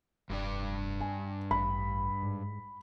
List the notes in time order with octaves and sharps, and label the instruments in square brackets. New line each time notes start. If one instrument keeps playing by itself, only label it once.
[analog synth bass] F1 [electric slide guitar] G2 D4 D5
[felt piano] G#5
[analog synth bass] A1 [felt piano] B5
[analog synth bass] G#2